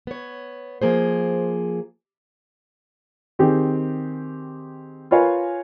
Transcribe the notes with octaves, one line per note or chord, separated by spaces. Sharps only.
B3 C#5
F3 A#3 G#4 C5
D#3 C4 G4 G#4
F4 A#4 B4 C#5 F5 G#5